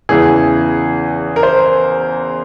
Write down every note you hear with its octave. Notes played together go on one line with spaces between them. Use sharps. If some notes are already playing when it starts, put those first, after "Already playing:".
E2 C#3 E3 G#4
A#4
C5